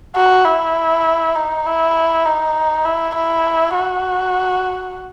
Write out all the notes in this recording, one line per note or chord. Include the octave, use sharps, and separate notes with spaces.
F#4
E4
D#4
E4
D#4
E4
E4
F#4